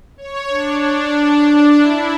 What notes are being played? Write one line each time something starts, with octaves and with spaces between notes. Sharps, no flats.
C#5
D4
D4
D4
D4
E4